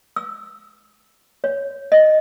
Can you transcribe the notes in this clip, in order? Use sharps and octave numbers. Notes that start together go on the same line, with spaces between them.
E6
C#5
D#5